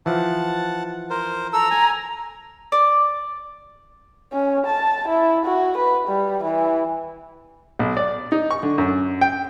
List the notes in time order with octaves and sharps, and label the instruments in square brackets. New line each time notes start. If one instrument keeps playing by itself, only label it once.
[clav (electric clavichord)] E3 F3 [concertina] F#5 A5
[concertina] A#4 C5
[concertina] A4 E6 [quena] A#5
[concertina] G#5
[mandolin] D5
[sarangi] C#4
A5
E4
F#4
B4
G3
E3
[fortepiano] B1
D5
D#4
C#6
D3
F#2
G5